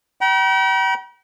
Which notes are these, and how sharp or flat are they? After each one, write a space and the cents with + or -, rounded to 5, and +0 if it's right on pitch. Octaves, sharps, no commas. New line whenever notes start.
G5 -40 A#5 +45